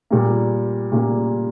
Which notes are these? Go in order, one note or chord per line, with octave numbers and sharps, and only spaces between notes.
A#2 G3 A#3
A#2 G3 A#3